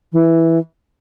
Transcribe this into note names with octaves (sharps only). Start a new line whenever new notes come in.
E3